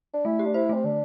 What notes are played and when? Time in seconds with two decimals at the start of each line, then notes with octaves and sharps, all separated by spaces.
0.14 D4
0.25 A3 E4
0.39 G4
0.45 D4
0.54 E4 C5
0.69 A3 C4
0.84 D3 D4